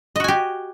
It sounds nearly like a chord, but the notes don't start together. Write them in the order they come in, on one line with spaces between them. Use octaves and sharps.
D#5 F#4 G#5 G4